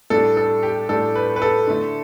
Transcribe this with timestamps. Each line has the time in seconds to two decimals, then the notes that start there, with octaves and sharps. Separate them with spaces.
0.10 A2 G3 D4 A4
0.37 A4
0.63 G4
0.89 A2 G3 D4 A4
1.15 B4
1.36 B4
1.42 A4
1.67 D3 A3 E4